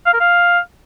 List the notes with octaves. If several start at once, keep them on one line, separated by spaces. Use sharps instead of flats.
F5
A#4
F5